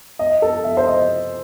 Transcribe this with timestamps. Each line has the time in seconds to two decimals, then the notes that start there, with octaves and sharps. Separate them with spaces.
0.19 D#5
0.42 A4
0.64 E5
0.77 C5
0.87 D#5